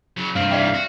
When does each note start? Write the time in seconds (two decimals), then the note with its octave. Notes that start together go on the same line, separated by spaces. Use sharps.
0.17 C#3 F#3
0.35 G2 C3 C4 F5
0.51 G#2 E3 D5 E5 G5
0.74 F#4